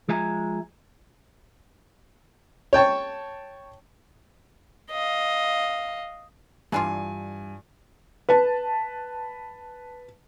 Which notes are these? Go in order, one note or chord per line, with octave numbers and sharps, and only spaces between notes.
F3 G#3 E5 G#5 A#5
C#5 G5 A5 C#6
D#5 F5
G2 E3 D4 F4 G#5
B4 A5